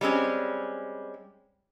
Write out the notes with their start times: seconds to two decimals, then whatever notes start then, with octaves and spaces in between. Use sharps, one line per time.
0.01 G3 G#3 C4 C#4